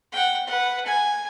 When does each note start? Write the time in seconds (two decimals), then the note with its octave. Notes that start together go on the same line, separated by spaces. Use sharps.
0.12 F#5 G5
0.47 B4 F#5
0.86 G#5